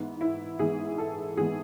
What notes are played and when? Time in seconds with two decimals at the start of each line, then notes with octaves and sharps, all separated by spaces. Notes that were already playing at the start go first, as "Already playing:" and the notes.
Already playing: G#2 E3 G#3 B3
0.21 E4
0.59 G#2 E3 G#3 B3 G#4
0.98 A4
1.37 G#2 E3 G#3 B3 G#4